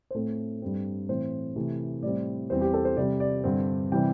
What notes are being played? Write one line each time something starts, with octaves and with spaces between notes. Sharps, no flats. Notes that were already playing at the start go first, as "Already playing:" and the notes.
C5
A2 A3 C4 A4
G2 G3 C4
A2 E3 A3 C4 C5
C3 E3 A3 C4
A2 G3 C4 D5
E2 E3 G3 C4 C5
G4
A4
C5
C3 G3 C4 D5
D5
G2 D3 C4
C3 E3 G3 C4 G5